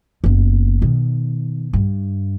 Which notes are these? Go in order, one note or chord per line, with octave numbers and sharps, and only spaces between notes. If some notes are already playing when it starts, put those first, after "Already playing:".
F#1 B3
B2 D#3
G2